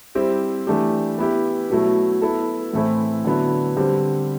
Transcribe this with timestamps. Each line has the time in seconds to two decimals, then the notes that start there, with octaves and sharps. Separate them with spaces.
0.15 G3 C4 E4 G4 C5
0.67 E3 A3 D4 G4
1.18 B3 E4 G4
1.70 B2 F#3 A3 E4
2.22 B3 E4 A4
2.73 A2 E3 A3 C4 E4
3.25 D3 F#3 B3 E4
3.77 D3 G3 C4 G4